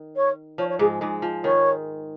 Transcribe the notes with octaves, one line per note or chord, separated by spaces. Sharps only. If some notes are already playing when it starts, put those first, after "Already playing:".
Already playing: D#3
C#5
F3 C#5
C#5
G#2 G#3 G#4
G#2 G#3
F3
D#3 C#5